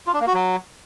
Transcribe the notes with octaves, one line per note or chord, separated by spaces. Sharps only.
F4
D4
A#3
F#4
F#3